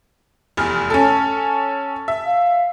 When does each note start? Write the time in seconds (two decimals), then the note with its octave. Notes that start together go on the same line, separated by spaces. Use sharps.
0.57 F1 E2 F6
0.90 C#4 A4 A5
2.08 E5
2.26 F5